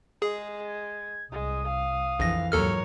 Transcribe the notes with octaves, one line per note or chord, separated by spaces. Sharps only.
G#3 G#4
G#6
C2 G#3 D#6
F5
A#1 F2 E3 A#6
D#2 G#2 F#3 A4 A#4 C#5 F6